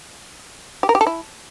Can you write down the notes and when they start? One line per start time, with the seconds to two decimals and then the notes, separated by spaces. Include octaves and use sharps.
0.83 G4
0.89 A#4
0.95 G4
1.01 A4
1.07 E4